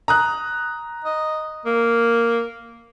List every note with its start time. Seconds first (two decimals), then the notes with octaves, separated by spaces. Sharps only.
0.08 A#5 D#6 F#6
1.05 D#5
1.66 A#3